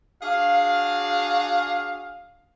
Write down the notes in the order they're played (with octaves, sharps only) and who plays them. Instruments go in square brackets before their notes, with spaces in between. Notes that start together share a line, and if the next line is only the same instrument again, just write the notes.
[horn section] D4 F#4 G#4 F5